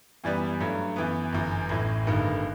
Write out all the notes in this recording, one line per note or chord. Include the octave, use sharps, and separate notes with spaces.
F#2 E3 G3 B3
G2 F#3 A3
F#2 E3 B3
G1 F#2 E3
A1 A2 E3
G1 G2 D#3 A3